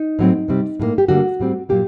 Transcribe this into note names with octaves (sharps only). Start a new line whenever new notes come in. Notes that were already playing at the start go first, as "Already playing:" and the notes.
Already playing: D#4
A2 F#3 C4
C3 G3 C4
A2 G3 A#3
G4
D3 G3 A#3 F#4
A2 G3 C4
A#2 F#3 A#3 G4